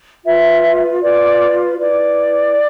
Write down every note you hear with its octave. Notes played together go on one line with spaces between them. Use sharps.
F4 B4 E5
F4 B4 D5
E4 B4 D5